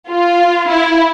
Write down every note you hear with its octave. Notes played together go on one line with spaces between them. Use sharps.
F4
E4